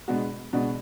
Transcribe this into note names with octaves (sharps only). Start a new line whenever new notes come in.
B2 G#3 B3 D4 F#4
B2 G#3 B3 D4 F#4